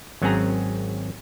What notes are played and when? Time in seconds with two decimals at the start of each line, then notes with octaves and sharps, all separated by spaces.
0.22 G#1 F#3 C4 C#4 G#4 A#5